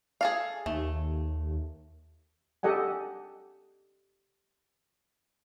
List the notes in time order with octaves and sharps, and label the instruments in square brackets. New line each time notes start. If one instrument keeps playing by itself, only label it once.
[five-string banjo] G#4 A4 F5
[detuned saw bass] D#2 [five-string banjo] A3
[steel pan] G4 A4 D#5 F#5 G#5